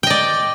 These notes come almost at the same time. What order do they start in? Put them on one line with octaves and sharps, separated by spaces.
G5 D#5 D5